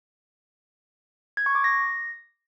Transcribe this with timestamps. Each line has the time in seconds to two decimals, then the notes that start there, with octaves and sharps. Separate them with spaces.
1.37 G#6
1.46 C#6
1.55 D6
1.64 A#6